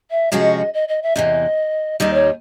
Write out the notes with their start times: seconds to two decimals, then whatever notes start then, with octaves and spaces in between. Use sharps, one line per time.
0.10 E5
0.31 C3 F3 G#3 C#4 F#4 D#5
0.73 D#5
0.88 D#5
1.02 E5
1.16 E2 C3 E3 D#5
1.99 D#2 D#3 G3 D#5
2.13 C#5